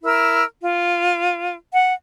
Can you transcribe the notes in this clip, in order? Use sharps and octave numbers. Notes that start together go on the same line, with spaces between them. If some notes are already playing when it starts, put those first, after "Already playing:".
E4 A#4 E6
F4
F#5